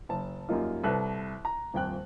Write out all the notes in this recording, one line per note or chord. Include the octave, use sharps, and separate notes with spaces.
F#1 A5
F#2 G3 A#3 D#4 F4
C2 A4 B4 F#6
A#5
D#1 F2 G5 F#6